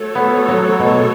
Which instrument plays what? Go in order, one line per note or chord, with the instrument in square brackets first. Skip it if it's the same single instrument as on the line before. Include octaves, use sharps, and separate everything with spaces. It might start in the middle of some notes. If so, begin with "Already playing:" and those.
Already playing: [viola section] A3 F#4 A4 C#5
[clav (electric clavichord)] B3
F#3
B2